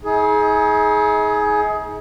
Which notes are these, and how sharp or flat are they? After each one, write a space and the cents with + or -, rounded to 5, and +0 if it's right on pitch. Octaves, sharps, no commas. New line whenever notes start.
D#4 +45 G#4 +20